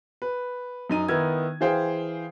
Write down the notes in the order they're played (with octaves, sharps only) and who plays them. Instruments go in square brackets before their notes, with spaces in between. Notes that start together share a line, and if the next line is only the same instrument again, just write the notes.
[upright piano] B4
F#2 D#4 D#7
D#3 B3 D#4 E4 E6 G#6
E3 G#4 C5 F5 G5